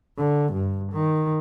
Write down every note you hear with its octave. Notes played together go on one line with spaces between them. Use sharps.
D3
G2
D#3